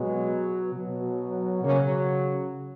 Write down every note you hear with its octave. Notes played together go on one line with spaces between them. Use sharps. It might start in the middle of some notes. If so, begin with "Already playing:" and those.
Already playing: B2 F#3 G#3 B3
B2 F#3
C#3 F#3 A#3 C#4